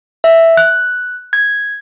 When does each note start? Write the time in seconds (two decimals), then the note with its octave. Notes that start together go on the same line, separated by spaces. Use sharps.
0.24 E5
0.57 F#6
1.33 G#6